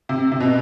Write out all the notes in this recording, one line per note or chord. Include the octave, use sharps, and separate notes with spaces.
C3
C3
B2